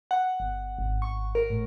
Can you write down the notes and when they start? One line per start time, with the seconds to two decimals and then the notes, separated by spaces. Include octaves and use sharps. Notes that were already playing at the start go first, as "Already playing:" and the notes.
0.11 F#5
0.40 G1
0.79 G#1
1.02 C#6
1.35 A#4
1.50 A2